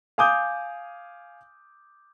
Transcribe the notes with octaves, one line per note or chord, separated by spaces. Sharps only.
F5 G#5 D6 D#6 G6